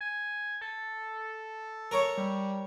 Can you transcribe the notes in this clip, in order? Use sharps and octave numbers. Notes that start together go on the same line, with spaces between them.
G#5
A4
A#4 C#5
G3